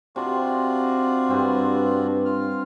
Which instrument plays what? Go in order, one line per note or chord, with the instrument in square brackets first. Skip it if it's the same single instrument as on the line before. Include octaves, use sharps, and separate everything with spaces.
[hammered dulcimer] C3 [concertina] D4 F4 F#4
[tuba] G2 [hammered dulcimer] C4 B4
[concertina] F4 F6